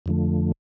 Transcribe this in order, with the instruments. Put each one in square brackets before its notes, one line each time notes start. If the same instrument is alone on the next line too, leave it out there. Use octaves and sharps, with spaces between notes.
[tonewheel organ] F2 D3 F3 A3